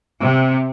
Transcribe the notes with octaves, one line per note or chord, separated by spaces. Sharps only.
C3